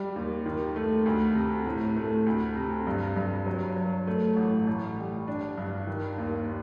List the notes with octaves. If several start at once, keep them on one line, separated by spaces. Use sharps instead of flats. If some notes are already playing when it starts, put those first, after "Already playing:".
Already playing: G3
D#2
D#3
A3
D2
C3
A2
A3
D2
C3
G2
G2
F#3
F#3
A3
A1
A1
G3
D4
G2
D#3
D#2